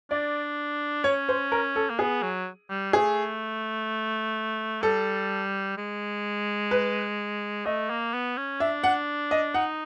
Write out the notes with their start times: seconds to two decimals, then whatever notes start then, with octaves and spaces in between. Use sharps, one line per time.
0.11 D4 D5
1.04 C#4 C#5
1.29 C5
1.52 A#4
1.76 A4
1.90 A#3
1.99 B3 G#4
2.22 F#3
2.70 G3
2.93 A3 G#4
4.82 G3 A4
5.77 G#3
6.71 B4
7.66 A3 D#5
7.90 A#3
8.13 B3
8.37 C#4
8.60 D4 E5
8.84 F#5
9.31 D#5
9.54 D#4 F#5